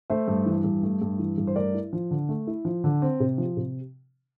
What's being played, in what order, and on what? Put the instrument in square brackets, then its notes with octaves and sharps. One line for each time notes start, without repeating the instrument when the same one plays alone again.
[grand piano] A3 C5 E5
G2
E3
G2
A3
G2
E3
G2
C5
A3 A#4 D5
E4
F3
D3
A3
E4
F3
D3
C4
C3
F3
C3